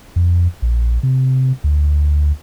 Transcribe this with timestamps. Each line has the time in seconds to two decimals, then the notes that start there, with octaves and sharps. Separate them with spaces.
0.16 F2
0.62 A#1
1.03 C3
1.64 D2